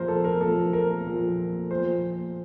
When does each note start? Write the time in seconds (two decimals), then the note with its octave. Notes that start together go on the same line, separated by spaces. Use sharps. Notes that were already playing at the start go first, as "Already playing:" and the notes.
Already playing: A#2 F3 A#4 C5
0.08 A4
0.24 A#4
0.41 A#2 F3 A4
0.73 A#4
1.06 A#2 F3
1.71 A#2 F3 C5